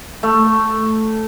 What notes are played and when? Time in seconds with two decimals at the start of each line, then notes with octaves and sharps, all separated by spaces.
0.23 A3